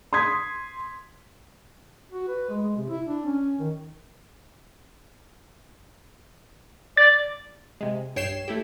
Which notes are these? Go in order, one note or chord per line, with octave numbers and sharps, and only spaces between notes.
C6 D#6 G#6 B6
F#4
B4
G#3
G#3
C3
E4
D4
C#4
D#3
D5 A6
C3 G#3
B1 G2 C#5 G5 C7 E7
A3 E4 G4